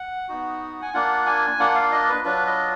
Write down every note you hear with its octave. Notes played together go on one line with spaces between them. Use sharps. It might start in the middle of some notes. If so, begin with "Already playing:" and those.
Already playing: F#5
B3 D#4 F#4
G#5
A#3 D4 F4 F#5
G#5
A#3 D4 F4 F#5
F5
D#5
B4
F#3 D4 F4 B4
D#5